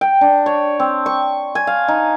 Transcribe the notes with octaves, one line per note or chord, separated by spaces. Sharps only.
G5
D4
C#5
C4
C#6
G#5
F5
D#4